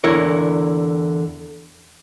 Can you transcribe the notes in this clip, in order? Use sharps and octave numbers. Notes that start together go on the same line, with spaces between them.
E2 D3 E4 A#4 C#5